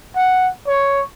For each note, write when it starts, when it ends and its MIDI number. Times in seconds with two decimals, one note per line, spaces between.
0.16 0.48 78
0.67 1.02 73